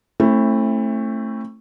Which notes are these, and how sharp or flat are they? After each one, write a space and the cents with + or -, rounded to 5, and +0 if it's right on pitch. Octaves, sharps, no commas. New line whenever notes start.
A3 +10 C4 +40 E4 +0